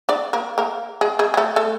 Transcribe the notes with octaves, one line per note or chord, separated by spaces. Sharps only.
D4 D5
A#3 A#4
A#3 A#4
G#3 G#4
G#3 G#4
G#4
A3 A4
A3 A4